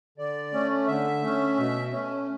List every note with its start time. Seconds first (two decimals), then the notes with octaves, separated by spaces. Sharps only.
0.18 D3 D5
0.53 A3 C#4
0.87 D3 E5
1.23 A3 C#4
1.57 B2
1.92 A3 C#4